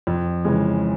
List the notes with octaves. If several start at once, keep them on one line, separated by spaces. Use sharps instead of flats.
F2
C#3 E3 G#3